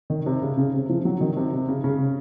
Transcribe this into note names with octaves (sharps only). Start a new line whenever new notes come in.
D#3
C3
C#3
C#3
C3
F3
F#3
D#3
C3
C3
C#3
C#3